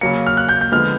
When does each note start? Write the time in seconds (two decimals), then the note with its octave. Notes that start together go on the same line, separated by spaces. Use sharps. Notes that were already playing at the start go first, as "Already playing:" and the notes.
0.01 C#3 F#3 A#3 C#7
0.26 F6
0.37 F#6
0.49 G6
0.61 G6
0.72 D3 F3 G#3 B3 F6